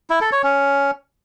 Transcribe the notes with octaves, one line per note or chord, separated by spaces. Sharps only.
E4
A4
C#5
C#4